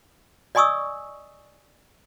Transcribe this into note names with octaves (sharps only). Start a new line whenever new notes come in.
D5 D#5 G#5 C#6 D#6 E6